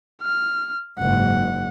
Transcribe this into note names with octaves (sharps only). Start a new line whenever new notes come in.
F6
F#1 G#2 F#5